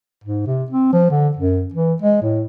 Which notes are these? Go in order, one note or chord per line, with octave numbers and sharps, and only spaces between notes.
G#2
C3
C4
F3
D3
F#2
E3
G#3
A2